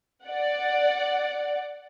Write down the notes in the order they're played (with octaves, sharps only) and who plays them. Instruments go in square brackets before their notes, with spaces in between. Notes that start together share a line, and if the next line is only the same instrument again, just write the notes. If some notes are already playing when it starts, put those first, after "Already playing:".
[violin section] D5 F#5